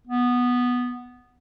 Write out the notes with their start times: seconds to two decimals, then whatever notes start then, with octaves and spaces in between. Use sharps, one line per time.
0.07 B3